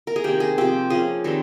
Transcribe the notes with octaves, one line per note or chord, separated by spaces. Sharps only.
A#4
G#4
C3 D#3 A#3 G4
G#4
C3 F3 C4 G4
F3 A#3 C#4 G#4
D#3 G3 C4